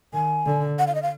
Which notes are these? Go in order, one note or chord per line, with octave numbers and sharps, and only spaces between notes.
D#3 G#5
D3
F#5
F5
D#5
F5